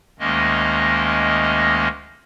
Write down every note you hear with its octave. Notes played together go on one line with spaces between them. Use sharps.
D2 D#3 G#3 A#3 C#4 D#5